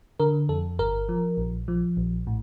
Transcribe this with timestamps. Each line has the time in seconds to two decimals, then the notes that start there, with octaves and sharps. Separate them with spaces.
0.20 D3 A#4
0.49 F2 A4
0.79 G1 A#4
1.09 F3
1.38 A#1
1.68 F3
1.97 A#1
2.27 A2